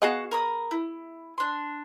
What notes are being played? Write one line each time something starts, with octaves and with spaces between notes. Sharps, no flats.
B3 F#4 G#4 D#5 F5 F#5
A#4 B5 D#6
E4
D4 C6